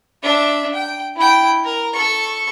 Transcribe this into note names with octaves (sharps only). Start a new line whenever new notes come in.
D4 E5
G5
E4 G5
A#4
A4 C#6